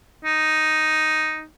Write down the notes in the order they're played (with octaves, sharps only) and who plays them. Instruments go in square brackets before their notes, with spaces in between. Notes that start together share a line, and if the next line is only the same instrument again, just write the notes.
[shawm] D#4